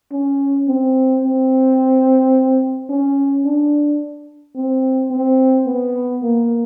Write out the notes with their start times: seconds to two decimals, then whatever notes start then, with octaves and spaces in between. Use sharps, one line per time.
0.12 C#4
0.68 C4
1.24 C4
2.89 C#4
3.45 D4
4.56 C4
5.11 C4
5.67 B3
6.23 A#3